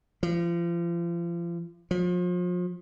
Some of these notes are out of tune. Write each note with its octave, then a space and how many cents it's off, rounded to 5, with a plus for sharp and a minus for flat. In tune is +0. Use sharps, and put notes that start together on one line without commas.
F3 -35
F3 +35